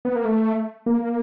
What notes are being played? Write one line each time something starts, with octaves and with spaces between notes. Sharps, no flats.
B3
A#3
A3
A#3